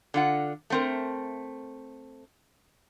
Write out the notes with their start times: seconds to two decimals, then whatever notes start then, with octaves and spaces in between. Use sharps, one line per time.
0.14 D3 F4 F#5
0.70 A3 C4 A#4